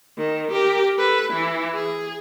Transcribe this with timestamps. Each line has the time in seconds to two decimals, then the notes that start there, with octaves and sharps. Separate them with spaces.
0.18 D#3
0.52 G4 A#4
0.95 A4 B4
1.31 E3 E4
1.75 G#4